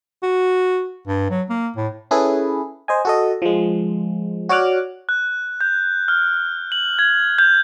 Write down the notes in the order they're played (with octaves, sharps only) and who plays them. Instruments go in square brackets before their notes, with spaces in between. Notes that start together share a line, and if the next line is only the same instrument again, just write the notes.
[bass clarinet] F#4
G2
F#3
A#3
A2
[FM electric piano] C#4 E4 G#4 A4 B4
C5 D#5 G#5
F#4 A4 D#5
F3 G#3
F#4 C#5 D5 D6 F6 F#6
[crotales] F#6
G6
F6
F#7
G#6
G6